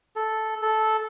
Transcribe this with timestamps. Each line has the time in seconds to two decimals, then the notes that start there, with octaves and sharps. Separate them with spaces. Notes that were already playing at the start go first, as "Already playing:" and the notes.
0.16 A4
0.62 A4